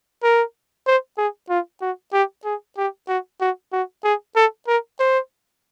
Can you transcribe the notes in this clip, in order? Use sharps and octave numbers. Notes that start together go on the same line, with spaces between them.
A#4
C5
G#4
F4
F#4
G4
G#4
G4
F#4
F#4
F#4
G#4
A4
A#4
C5